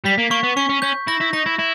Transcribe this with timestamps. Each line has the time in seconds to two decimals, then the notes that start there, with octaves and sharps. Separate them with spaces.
0.05 G3 B6
0.19 A#3
0.31 A#3 C#6
0.44 B3
0.57 C#4 C#6
0.70 C#4
0.82 C#4 G6
1.08 E4 A#6
1.21 E4
1.33 D#4 A#6
1.46 E4
1.59 E4